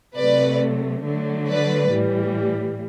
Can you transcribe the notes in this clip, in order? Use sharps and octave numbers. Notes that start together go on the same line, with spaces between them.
C3 F#3 A3 B4 D5
D3 F#3 A3
B4 D5
A2 E3 G3